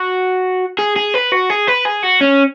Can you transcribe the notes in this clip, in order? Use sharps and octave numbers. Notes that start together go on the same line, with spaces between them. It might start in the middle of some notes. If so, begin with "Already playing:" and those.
Already playing: F#4
G#4
G#4
B4
F#4
G#4
B4
G#4
F#4
C#4